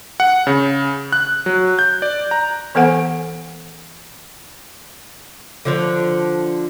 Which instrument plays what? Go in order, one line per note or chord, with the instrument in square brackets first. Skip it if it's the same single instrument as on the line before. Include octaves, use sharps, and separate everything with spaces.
[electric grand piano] F#5
C#3
F#6
F#3
G6
D5
A#5
[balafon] E3 B3 A4 C5 F#5 G#5
[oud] D3 F3 D4